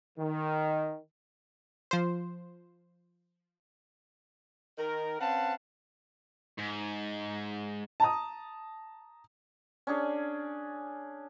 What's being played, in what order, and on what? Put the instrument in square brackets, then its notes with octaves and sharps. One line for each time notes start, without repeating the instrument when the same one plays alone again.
[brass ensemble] D#3
[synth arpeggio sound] F3 C5
[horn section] D#3 A#4
C4 C#4 B4 F5 F#5 A5
[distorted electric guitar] G#2
[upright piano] A5 A#5 D#6
[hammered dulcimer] C#4 D4 G#4